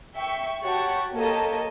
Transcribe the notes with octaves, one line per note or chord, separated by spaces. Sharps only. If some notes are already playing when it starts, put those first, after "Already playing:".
E5 G5 C#6
F#4 G4 C#5 F#5 A5 C#6
A#3 G4 A4 C#5 D#5 A5